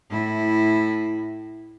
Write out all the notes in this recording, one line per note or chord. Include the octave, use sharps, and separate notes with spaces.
A2 E4